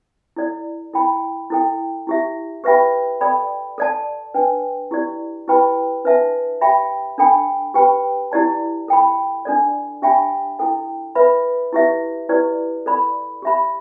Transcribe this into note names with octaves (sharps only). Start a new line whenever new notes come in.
E4 A4 D5
E4 A4 G5 B5
E4 A4 G5
E4 G4 E5
G4 B4 E5 G5 B5
A4 D5 G5 B5
A4 D5 A5
D4 B4 G5
E4 G4 D5
E4 G4 B4 G5 B5
D4 B4 E5 A5
G4 E5 G5 B5
D4 A4 G5 B5
G4 B4 G5 B5
E4 G4 D5 A5
A4 G5 B5
D4 A4 D5
D4 G4 E5 G5 B5
E4 A4 G5
B4 E5 B5
E4 G4 B4 E5
E4 G4 B4 D5
A4 D5 B5
G4 E5 B5